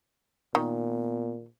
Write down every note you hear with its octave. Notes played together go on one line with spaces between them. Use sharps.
A#2 D#3 B3